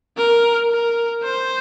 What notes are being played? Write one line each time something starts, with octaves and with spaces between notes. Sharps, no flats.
A#4
A#4
C5